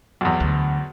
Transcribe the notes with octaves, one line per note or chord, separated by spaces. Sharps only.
B1 E2
D2